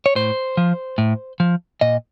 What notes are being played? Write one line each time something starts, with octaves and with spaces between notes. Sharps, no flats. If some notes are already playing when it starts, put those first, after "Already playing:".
C#5
A2 C5
F3
A2
F3
A#2 D#5